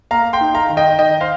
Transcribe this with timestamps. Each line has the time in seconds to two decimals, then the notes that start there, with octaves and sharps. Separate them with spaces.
0.11 A#3 F5 A#5
0.33 G5 C6
0.41 D#4
0.54 F5 A#5
0.69 D#3
0.77 D#5 G5
0.98 D#3 D#5 G5
1.21 C5 F5